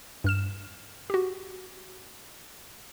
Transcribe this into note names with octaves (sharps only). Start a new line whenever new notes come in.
G2 F6 E7
F#4 G4